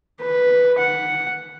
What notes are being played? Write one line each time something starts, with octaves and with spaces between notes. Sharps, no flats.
B4
F#5